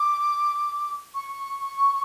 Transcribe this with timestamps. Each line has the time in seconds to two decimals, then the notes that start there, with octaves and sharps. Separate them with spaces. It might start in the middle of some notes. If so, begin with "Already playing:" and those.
Already playing: D6
1.15 C#6